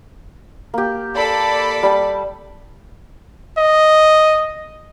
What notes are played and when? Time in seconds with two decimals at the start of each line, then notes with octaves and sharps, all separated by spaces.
0.74 A#3 G4
1.16 A4 D5 B5
1.83 G3 A5
3.58 D#5